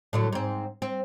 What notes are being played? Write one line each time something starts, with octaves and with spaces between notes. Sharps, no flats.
A2 D3 F#3
G#2 C4
C4